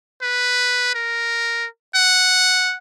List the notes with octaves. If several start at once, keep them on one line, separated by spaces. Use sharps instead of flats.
B4
A#4
F#5